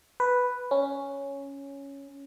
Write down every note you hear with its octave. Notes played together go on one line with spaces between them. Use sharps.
B4
C#4